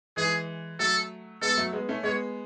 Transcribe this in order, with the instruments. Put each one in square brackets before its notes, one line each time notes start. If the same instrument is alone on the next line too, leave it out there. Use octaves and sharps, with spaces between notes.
[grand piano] E3 G#3 [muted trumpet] G#4
[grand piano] F#3 A3 [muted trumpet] A4
[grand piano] G#3 B3 [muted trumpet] A4
[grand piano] F#3 A3
G#3 B3
A3 C#4
[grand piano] G#3 B3 [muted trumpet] C#5